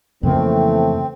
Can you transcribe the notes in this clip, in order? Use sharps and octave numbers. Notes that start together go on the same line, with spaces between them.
F2 C#3 E3 A3 A#3 C4